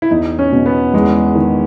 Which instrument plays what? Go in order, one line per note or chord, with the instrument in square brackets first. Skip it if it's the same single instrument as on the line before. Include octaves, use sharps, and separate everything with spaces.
[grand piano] E4
[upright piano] E2 [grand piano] D#4
[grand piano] C#4
[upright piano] B2
[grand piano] B3
[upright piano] E2 [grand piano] G#3
[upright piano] D#3